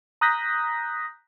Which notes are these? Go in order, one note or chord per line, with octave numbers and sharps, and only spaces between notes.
A#5 D#6 F#6 G6 A#6 B6